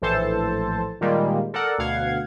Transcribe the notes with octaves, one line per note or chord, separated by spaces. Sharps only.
A#1 A2 E3 A4 C5 A5
A#2 D#3 G3 G#3 A#3
A4 A#4 D5 F#5
D2 B2 F5 F#5 G#6